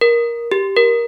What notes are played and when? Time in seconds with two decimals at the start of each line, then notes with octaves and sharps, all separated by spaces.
0.01 A#4
0.51 G4
0.76 A#4